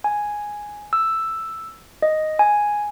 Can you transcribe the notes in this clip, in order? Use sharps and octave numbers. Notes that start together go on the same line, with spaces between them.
G#5
E6
D#5
G#5